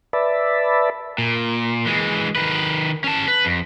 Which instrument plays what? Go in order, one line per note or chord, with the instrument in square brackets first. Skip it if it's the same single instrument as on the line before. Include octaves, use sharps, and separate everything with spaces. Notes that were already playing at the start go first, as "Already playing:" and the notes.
[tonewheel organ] B4 D5 E5 A5 B5
[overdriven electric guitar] A#2
E3 G#3
D#3 B4
C#4 A5
B4
F2